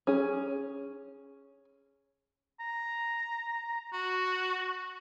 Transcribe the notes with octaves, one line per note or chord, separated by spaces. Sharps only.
C#4 G#4
A#5
F#4